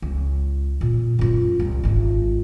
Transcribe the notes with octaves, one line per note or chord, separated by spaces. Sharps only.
C#2
A#2
F#2 F4
C2
G#1 F4